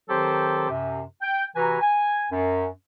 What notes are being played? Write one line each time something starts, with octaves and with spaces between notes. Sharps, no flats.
D#3 F#3 C4 G4 A4 C5
F#2 C3
G5
C3 E3 F#4 B4 G#5 A#5
G#5
F#2